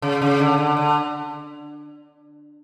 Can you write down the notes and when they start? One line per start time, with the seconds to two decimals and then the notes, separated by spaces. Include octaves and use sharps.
0.02 C#3
0.22 C#3
0.39 D3
0.58 D3
0.77 D3